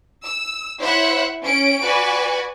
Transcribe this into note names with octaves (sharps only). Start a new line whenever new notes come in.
E6
E4 C5 C#5 E5 F#5
C#4 D7
F#4 B4 D5 G#5